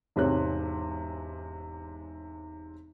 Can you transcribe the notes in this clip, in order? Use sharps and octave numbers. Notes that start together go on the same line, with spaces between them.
E1 G#2 C3 C4 C#5 F#6